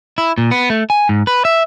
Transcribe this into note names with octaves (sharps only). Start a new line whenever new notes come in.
E4
A#2
B3
A3
G#5
G#2
B4
E5